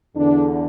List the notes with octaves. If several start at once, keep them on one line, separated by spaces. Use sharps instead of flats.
E2 D3 D4